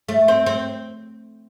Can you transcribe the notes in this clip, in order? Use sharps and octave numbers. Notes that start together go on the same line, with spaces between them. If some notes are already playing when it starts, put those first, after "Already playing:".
A3
C4
C4